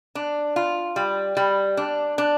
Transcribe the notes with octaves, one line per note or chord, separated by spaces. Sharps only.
D4
F4
G3
G3
D4
D4